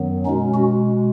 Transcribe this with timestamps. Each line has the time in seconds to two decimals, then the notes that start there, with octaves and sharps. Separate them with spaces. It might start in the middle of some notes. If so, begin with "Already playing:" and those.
Already playing: F#2 D#3 F#3 B3
0.26 B2 G#3 C#4 D#4
0.54 C#4 F#4